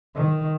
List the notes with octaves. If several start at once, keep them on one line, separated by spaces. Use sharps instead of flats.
D#3